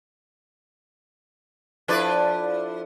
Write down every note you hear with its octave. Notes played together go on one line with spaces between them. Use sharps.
F3 D4 E4 A4 B4 D5